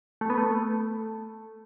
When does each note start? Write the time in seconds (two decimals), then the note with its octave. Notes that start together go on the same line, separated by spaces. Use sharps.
0.21 A3
0.30 B3
0.38 A3